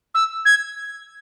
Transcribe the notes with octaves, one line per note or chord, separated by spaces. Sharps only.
E6
G#6